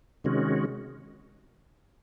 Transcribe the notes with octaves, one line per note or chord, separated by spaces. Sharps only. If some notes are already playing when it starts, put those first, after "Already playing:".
C3 D#3 G#3 C#4 F#4